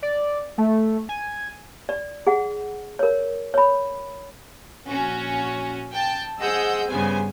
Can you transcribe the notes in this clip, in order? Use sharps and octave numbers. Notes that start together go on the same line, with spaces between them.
D5
A3
G#5
D5
G#4 F#5
A#4 C#5
C#5 B5
A#1 C#4 F#4
G5 A5
G#4 C5 D#5 F#5 E6 G6
G2 C#3 B3 C5 G#5